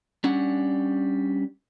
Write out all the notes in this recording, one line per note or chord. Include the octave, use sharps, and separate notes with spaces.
G3 C#4 D4 F#5